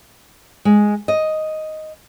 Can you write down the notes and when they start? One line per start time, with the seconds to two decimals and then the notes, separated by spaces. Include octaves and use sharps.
0.65 G#3
1.08 D#5